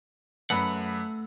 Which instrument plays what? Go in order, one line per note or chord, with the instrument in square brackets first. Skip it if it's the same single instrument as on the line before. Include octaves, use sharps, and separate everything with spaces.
[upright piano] F#2 B4 [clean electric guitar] A3 F#5